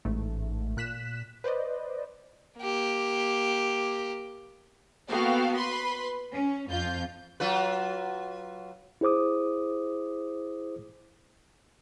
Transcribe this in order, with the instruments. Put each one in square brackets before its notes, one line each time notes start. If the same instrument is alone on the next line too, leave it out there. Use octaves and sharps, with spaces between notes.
[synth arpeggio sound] A1 G#2 A3
A#2 F#6 B6 E7
B4 C5 D5 D#5
[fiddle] A#3 G4
[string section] A#3 B3 F#4 A4 F5 G5
B4 B5 C6
C#4
F2 F4 G6
[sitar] F#3 F4 B4
[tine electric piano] E4 G#4 C5 D6 D#6